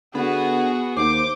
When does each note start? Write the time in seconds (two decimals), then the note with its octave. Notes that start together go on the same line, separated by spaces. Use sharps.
0.15 D3 B3 F#4 G#4
0.96 D#2 C5 D6